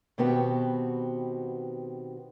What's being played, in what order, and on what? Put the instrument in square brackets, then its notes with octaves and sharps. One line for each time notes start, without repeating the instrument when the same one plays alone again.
[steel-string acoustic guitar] B2 D#3 B3 C4 F#4 G4